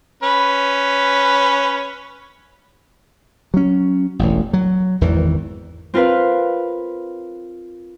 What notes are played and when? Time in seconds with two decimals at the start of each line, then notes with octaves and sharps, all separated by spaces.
0.23 C#4 B4
3.54 F#3 C#4
4.19 E1 A1
4.53 F#3
5.01 G#1 E2 D#3 E3
5.94 C4 F4 A#4 B4 F5